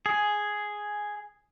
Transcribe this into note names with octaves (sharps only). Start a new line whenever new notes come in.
G#4